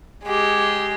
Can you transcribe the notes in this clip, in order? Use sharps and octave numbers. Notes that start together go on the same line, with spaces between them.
G#3 G4